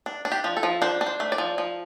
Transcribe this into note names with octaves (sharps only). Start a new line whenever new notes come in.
D4
D4
G4
F3
A4
F3
D4 C5
D4
C5
A3
D5
F3
F3